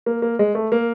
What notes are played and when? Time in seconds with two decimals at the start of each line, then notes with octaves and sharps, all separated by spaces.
0.06 A#3
0.22 A#3
0.39 G#3
0.55 A3
0.72 A#3